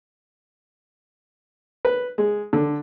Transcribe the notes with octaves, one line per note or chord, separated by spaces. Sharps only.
B4
G#3
D3